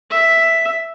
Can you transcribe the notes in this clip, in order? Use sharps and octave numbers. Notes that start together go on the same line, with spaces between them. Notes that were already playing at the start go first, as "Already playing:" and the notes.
E5